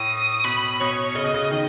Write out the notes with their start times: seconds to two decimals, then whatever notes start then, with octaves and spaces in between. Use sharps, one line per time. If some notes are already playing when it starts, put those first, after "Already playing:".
Already playing: A2 D#6
0.44 B2 B5
0.80 B2 C#5
1.15 C#3 D#5
1.24 B2
1.34 C#3
1.51 D#3